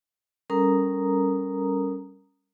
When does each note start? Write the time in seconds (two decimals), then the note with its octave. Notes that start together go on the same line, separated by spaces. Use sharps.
0.50 G3 C#4 A4 A#4 A#5 D#6